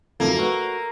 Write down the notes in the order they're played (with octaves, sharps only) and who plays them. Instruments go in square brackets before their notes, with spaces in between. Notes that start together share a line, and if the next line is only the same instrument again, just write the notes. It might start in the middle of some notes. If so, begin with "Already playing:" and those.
[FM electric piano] E2 G2 C#3 [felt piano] F3 F#3 [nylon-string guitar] A3 A4 [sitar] A#3
[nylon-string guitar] F#4 [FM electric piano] B4 C#5 [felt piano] E6